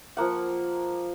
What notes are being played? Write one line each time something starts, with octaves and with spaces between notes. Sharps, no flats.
F3 A#3 F#5